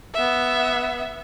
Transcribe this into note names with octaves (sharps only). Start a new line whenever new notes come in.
B3 E5